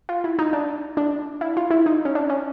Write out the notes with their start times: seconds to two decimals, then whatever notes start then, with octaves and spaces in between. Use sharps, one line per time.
0.09 F4
0.24 E4
0.39 D#4
0.53 D4
0.97 D4
1.41 E4
1.57 F4
1.71 E4
1.86 D#4
2.05 C#4
2.15 D4
2.30 C#4